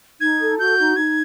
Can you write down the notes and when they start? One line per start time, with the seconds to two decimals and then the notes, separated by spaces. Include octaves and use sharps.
0.21 D#4 G#6
0.40 A4
0.59 F#4 G6
0.78 D#4
0.96 D#4 G#6